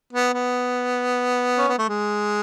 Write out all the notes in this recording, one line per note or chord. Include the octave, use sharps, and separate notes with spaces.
B3
B3
C#4
B3
A3
G#3